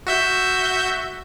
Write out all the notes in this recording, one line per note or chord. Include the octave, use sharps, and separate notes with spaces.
F#4 E5 G6